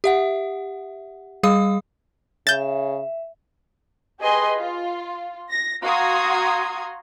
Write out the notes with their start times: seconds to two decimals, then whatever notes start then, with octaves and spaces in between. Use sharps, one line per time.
0.04 G4 E5 F#5
1.43 G3 G#4 F5 D#6
2.47 C#3 E5 G6 A6
4.20 G4 G#4 B4 D#5 G#5 C6
4.58 F4
5.49 A#6
5.82 F#4 F5 A#5 C6 D#6 G#6